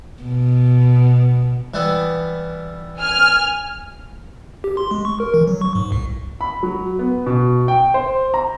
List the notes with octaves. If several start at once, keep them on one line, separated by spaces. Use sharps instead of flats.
B2
E3 G3 B3
G#5 F6
G4
C6
G#3
C#6
A#4
E3
F#3
C#6
G#2
C2
B5
F#3
B3
B2
G5
C5
A#5